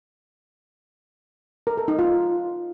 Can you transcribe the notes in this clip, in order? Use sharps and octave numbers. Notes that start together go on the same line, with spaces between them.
A#4
A4
D#4
F4